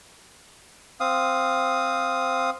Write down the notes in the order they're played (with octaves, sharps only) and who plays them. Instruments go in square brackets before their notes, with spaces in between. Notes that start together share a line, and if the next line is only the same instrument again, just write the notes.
[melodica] C4 F5 D#6